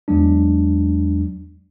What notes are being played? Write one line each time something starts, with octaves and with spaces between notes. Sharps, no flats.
E2 F#3 G#3 D4